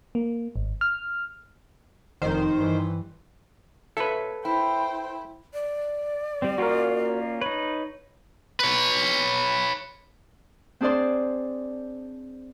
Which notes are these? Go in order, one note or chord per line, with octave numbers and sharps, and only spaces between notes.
A#3
G#1
F6
F1 D#3 C5
G2 E3
A#2 A4 B4 C#5 E5
E4 C5 G5
D5
G3 C4
A#3 C#4 F4 F#4 A#4
D#4 B4 C#5
B4 C#5
C4 D4 G#4 C5 D5 C6